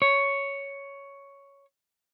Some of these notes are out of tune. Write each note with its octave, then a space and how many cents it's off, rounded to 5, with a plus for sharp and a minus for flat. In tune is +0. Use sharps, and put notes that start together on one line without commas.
C#5 +5